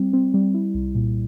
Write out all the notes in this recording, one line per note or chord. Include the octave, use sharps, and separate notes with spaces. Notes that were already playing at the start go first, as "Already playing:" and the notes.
Already playing: G3 C4
C4
G3
E4
C2
A#2